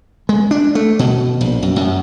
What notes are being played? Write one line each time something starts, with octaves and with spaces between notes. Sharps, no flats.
G#3
D4
A3
B2
A#1
F#2
F#2